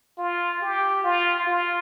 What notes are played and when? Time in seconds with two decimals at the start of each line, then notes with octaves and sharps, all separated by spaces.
0.18 F4
0.61 G4
1.04 F4
1.47 F4